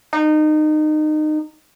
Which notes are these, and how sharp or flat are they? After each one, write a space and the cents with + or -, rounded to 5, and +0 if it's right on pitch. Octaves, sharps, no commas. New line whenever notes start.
D#4 -25